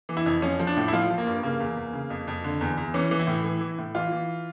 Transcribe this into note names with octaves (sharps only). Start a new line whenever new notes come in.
E3
E4
F2
F3 C#4
F3
D4
A2
E4
F3 F4
F3
A#3
G2
C#3 A#3
E2
E2
C#3
F2
F2
D3
E2
E2
E3 C#4
E3
E4
A2
E3
E3
A2
E3 F4
E3